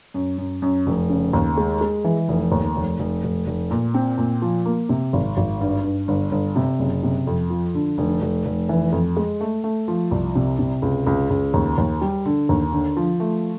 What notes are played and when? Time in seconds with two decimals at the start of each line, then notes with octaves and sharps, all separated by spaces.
0.14 F#2
0.38 F#2
0.62 F#2
0.87 F1
1.10 C#3
1.33 D#2
1.57 G#3
1.81 G#3
2.04 E3
2.29 F1
2.52 D#2
2.76 F1
2.99 F1
3.24 F1
3.47 F1
3.71 A#2
3.94 C4
4.18 A#2
4.42 F3
4.65 A#3
4.89 C3
5.13 G#1
5.37 G#1
5.61 G2
5.84 G2
6.08 G1
6.32 G1
6.56 C3
6.79 F#1
7.03 C3
7.27 F2
7.50 F3
7.74 D3
7.98 F1
8.22 F1
8.46 F1
8.69 E3
8.92 F2
9.17 G#3
9.41 A3
9.64 A3
9.88 F3
10.11 C2
10.35 C3
10.59 C3
10.82 C#2
11.06 C#2
11.30 C#2
11.54 D#2
11.78 D#2
12.01 G3
12.26 D3
12.49 D#2
12.72 D3
12.97 F3
13.20 A3